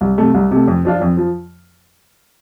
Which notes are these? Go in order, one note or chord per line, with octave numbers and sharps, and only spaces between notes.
C2
C3 A3
C2
C3 A3
F2
F3 D4 F4
F2
F3